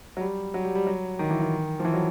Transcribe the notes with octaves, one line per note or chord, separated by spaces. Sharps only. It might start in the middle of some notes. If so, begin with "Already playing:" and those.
F#3
G3
F#3
G3
G3
F#3
D#3
E3
D#3
F3
E3
F#3